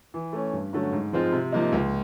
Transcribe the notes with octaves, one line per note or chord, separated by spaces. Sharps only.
E3
A3 C#4
G2
D3 F#3 A3 C#4
G#2
F3 G#3 C4 F4
C3
F3 A#3 D#4
C#2